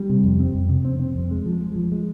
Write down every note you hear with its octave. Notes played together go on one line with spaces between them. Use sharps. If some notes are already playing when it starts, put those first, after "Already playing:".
Already playing: G3
C3
F2
C4
F2
C3
C4
C4
F2
G#3
F3
G#3
F3
G#3